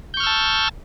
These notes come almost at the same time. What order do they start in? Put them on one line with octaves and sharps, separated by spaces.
G6 C#6 F6 E6 A5